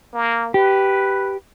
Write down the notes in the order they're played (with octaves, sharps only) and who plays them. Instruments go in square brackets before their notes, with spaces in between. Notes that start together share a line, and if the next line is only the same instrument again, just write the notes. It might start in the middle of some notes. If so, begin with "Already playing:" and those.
[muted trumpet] A#3
[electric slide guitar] G4 [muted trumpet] B4